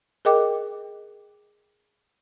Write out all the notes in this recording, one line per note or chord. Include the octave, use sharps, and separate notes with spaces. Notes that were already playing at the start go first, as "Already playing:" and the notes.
G#4 A#4 D#5 G5 D6